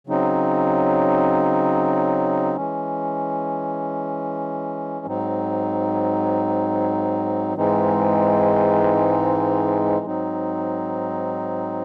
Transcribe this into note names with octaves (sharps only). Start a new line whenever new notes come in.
C#3 F#3 C4 D#4
E3 G#3 C#4
G#2 F#3 C4 D#4
G#2 E3 G#3 C4 D#4
G#2 F#3 C4 D#4